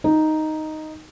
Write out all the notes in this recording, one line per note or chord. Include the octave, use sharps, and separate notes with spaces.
D#4